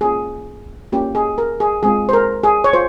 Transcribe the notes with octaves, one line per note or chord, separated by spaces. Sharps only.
A#3 C#4 F4 G#4
A#3 C#4 F4 G4
G#4
A#4
G#4
G#3 C4 F4 G#4
C5
A#4
G#4
C#5
F4 C5